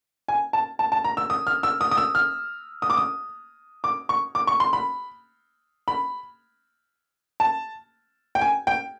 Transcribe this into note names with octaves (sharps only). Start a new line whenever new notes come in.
G#5
A5
A5
A5
A#5
E6
D#6
F6
E6
D#6
D#6
E6
F6
D#6
D6
D#6
D6
C#6
D6
C#6
C6
B5
B5
A5
G5
G#5
G5